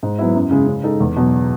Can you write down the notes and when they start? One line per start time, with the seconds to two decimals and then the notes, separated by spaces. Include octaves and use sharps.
0.03 G#2
0.19 F#3 B3 E4
0.35 F#2
0.51 C#3 G#3
0.67 C#3
0.84 G#3 D#4 A4
1.00 E2
1.16 B2 F#3 B3